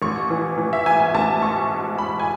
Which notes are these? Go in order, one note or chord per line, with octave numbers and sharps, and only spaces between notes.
A1 C#6
E3
E3
E5
G#2 G#5
G#5
A1 A5
G#2 C#6
G#3
G#2 B5
G#5